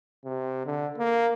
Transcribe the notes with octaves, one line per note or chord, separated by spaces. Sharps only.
C3
D3
A#3